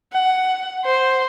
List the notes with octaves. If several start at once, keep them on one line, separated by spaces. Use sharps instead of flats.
F#5
C5